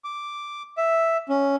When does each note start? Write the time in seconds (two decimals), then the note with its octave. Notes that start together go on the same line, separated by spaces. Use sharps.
0.04 D6
0.77 E5
1.29 C#4